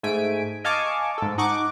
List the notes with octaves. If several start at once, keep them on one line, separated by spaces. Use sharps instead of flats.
G#2 A3 G#5 B6 D7
D#5 F5 G#5 A5 C#6 D6
G#2 A4
D#4 F#5 C#6 D6